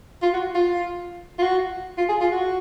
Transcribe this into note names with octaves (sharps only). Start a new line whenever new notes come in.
F4
F#4
F4
F4
F#4
F4
G#4
F4
F#4